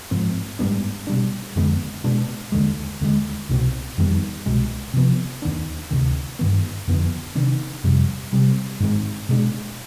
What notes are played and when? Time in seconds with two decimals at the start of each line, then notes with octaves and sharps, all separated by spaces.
0.11 G#2 F3 C4
0.59 G#2 G3 B3 D4
1.07 B2 G3 D4
1.56 F2 D3 G#3 B3
2.04 B2 G#3 B3 D4
2.52 D#2 D3 G#3
3.01 D#2 D3 G#3
3.49 C2 B2 G#3 C4
3.98 F2 D#3 G3 B3
4.46 C2 B2 G#3
4.94 C3 F3 B3
5.42 D#2 D#3 B3 D4
5.91 D2 C3 D#3
6.39 G2 D#3 B3
6.88 F2 D3 F3 B3
7.35 C3 D#3 B3 D4
7.84 F2 C3 G3
8.33 C3 G3 C4
8.80 G#2 D#3 G#3 C4
9.29 B2 G#3 D4